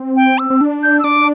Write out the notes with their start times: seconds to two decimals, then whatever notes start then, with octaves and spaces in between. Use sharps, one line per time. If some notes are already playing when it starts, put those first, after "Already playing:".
Already playing: C4
0.16 G5
0.39 E6
0.50 C4
0.61 D4
0.83 G6
0.99 E6
1.04 D4 D6